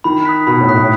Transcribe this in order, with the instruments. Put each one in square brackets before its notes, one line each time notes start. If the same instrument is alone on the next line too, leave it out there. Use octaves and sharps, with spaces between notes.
[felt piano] D#3 [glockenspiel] B5
[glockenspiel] D#6 F#6 B6
[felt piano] B2 [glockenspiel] B5
[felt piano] A2
[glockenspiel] D#6 F#6 B6
[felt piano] A2